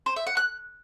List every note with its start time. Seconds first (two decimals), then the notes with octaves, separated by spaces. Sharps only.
0.06 C5
0.16 E5
0.27 F#5
0.37 F#6